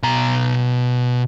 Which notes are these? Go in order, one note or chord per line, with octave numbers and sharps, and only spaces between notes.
B2 A#5